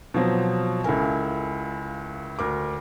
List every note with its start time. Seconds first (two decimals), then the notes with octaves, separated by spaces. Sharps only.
0.14 B2 F3 F#3 C4
0.84 C#2 C#3 E4 A4 A#4 G#5
2.39 D2 A#4 D6